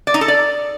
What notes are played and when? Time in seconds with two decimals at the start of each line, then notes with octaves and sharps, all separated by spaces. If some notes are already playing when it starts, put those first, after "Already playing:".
0.07 D5
0.14 D#4
0.21 A4
0.28 D5